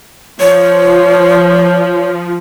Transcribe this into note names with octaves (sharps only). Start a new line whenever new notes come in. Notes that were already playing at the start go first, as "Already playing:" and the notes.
F3 C#5